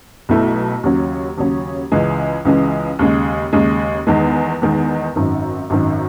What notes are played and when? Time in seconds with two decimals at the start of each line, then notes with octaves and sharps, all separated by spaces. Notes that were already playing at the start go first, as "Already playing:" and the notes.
0.29 B1 B2 A3 E4
0.83 D#2 C#3 F#3 C#4
1.37 D#2 C#3 F#3 C#4
1.92 C#2 C#3 E3 G#3
2.45 C#2 C#3 E3 G#3
2.99 D#2 C#3 G#3
3.53 D#2 C#3 G#3
4.07 E2 D#3 G#3
4.62 E2 D#3 G#3
5.16 G#1 F#2 D#3
5.70 G#1 F#2 D#3